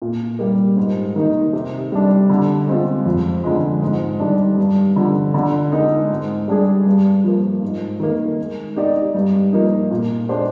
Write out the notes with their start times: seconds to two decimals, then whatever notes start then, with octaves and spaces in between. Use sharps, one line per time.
0.02 A#2
0.39 G3 A#3
0.77 G#2
1.16 D#3 A#3 D#4
1.53 C3
1.92 G3 D4
2.30 D3
2.67 G#3 C4 F4
3.06 F2
3.44 D3 F3 G#3
3.82 G#2
4.20 D#3 G3 D4
4.58 G2
4.96 D3 F3
5.34 D3
5.72 G#3 D#4 A#4
6.10 G#2
6.48 G3 D4 G#4
6.86 G2
7.24 F3 A#3
7.62 G#2
8.00 D#3 A#3
8.39 G#3
8.76 D#4 G4 D5
9.14 G2
9.53 F3 A#3 D#4
9.91 A#2
10.29 G#3 D4 G4 C5